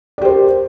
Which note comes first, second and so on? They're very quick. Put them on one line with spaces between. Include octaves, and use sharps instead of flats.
D5 G4 C5 A#4